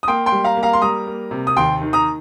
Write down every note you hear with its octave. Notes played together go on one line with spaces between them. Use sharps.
D#6
A#3 G5 C6
G5 C6
G3
F5 A#5
A#3
F5 A#5
C6
G3 A#5 D#6
A#3
C3
D#6
D#2 G5 C6
D#3
A#5 D#6